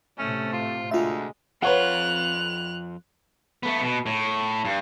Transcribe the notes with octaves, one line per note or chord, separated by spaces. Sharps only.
A2 C3 A3 C#4
F4
D2 G#3 F4 E5
F2 F4 B4 C#5 F5 F#5 F#6 F7
A3 B3
B2
A2
G2